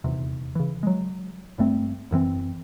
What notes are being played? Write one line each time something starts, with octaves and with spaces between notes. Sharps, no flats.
D#1 E2 C3
C#3 E3
F#3 G#3
G1 G2 A3 C4
F#1 F#2 E3 C4